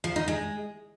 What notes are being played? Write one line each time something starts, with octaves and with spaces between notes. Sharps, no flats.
F3
D#4
G#3